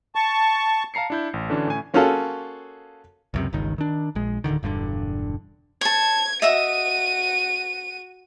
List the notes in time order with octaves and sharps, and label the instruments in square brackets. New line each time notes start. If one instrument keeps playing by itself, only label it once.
[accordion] A5 C#6
[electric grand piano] F5 A5 A#5 C7 C#7
D4 E4 G6
A1
D3 E3 C#4 D4 F#4
A2 C#4 G#5
[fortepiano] A#3 C#4 F4 F#4 G#4 A4
[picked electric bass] C#2 F#2 C3
G1 C#2 D#3
D#3 D4
A#1 G#3
D1 D2 D3 D#3
E1 G2 B2 D3
[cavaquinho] C#5 A5 [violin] G#6
[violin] F#4 D#7 [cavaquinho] D#5 E5 D#6